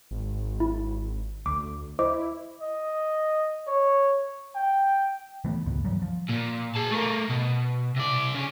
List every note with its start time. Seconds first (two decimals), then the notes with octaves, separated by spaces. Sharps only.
0.11 G#1
0.60 E4
1.46 D2 D6
1.99 E4 C5 D#5 D6
2.62 D#5
3.67 C#5
4.55 G5
5.45 E3 A3 B3
5.66 C#2 G2 B3
5.85 D#3 E3 F#3 G3
6.02 F3
6.29 A#2
6.75 G#4 A5
6.91 A3 A#4
7.29 B2
7.96 C3 D5
8.35 C#3 G#4